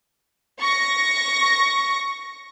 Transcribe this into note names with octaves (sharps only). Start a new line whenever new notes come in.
C#6 A#6